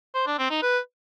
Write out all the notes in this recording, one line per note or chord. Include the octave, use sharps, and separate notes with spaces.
C5
D4
C4
D#4
B4